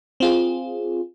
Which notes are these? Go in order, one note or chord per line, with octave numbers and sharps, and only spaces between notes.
C4 F4 G#4